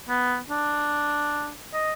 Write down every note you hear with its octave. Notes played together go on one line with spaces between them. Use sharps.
B3
D4
D#5